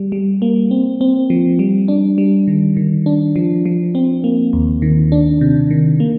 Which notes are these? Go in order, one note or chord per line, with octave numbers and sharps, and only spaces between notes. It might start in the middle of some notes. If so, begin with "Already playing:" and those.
Already playing: G3
G3
A#3
C4
C4
F3
G3
D4
G3
D#3
D#3
D4
F3
F3
C4
A#3
D#2
D#3
D4
C3
D#3
A#3